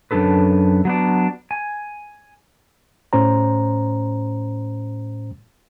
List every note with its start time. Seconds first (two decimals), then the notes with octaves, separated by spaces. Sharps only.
0.11 F#2 G3 D4 A4 B4
0.85 F#3 B3 D4
1.51 G#5
3.13 A2 C#4 C5 A#5